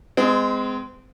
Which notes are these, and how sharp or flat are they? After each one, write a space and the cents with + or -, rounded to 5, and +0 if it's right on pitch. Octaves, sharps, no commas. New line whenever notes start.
G#3 +0 C4 -35